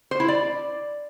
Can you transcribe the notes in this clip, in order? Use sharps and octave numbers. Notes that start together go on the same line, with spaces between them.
C5
E4
D5